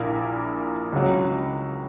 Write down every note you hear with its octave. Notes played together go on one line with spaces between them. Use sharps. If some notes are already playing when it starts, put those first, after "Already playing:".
Already playing: A#1 A#2 A#3 E4 A#4
C#2 C#3 F#3